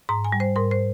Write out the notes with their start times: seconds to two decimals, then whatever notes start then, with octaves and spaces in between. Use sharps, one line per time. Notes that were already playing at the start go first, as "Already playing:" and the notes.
0.09 G#2 A#5
0.24 G#5
0.32 G3
0.40 C5
0.56 G#2 A#4
0.71 C5